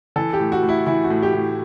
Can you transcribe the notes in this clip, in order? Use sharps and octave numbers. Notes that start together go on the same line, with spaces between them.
E3 A4
G4
A2
F#4
A2
E4
E3 E4
F#4
A2
G4
A2